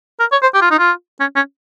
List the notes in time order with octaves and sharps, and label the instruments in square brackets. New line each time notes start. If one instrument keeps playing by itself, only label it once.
[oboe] A#4
C#5
C5
G4
F4
D#4
F4
C#4
C#4